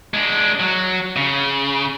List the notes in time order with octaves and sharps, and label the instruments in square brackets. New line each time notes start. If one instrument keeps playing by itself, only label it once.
[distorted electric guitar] G#3 D4
F#3
C#3